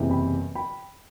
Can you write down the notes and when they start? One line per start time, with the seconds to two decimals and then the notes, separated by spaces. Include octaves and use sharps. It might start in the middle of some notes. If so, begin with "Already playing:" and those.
Already playing: F#1 E2 C3 E3
0.10 G5 B5
0.55 G5 B5